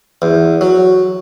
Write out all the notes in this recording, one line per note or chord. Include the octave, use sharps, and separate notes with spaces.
E2
F#3